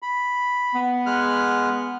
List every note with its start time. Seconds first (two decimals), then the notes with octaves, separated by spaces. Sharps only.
0.02 B5
0.74 B3
1.06 G#3 F6 F#6